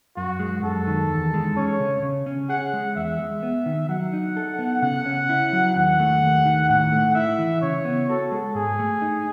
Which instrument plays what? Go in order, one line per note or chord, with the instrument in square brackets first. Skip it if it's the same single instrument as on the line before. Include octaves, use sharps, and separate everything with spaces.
[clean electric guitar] F#2 [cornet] F#4
[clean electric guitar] G#3
[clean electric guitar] F#2 [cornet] A4
[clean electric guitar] D#3
E2
G#3
[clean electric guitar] C#4 [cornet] C#5
[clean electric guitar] C#3
C#3
C#4
[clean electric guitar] G#4 [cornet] F#5
[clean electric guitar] G#3
[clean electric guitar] E2 [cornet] E5
[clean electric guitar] G#3
B3
D#3
[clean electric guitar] F#3 [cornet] F#5
[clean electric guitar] D#4
A4
B3
[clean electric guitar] C#3 [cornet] F#5
[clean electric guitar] C#4
E4
F#3
[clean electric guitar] D#2 [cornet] F#5
[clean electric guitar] A3
D#2
D#3
[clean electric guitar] A2 [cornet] F#5
[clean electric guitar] A3
[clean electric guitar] E4 [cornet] E5
[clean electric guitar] E3
[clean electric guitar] C#3 [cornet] C#5
[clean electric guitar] B3
[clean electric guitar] F#4 [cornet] A4
[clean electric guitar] G#3
[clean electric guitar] G#2 [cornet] G#4
[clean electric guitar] A3
D#4